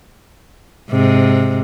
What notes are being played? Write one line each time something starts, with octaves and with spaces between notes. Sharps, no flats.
G#2 C3